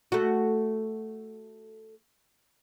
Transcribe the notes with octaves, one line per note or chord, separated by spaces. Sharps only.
A3 F#4